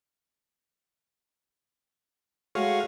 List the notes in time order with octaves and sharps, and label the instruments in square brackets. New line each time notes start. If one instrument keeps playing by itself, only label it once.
[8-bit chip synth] G#3 A3 G#4 [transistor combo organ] F#4 C#5 F5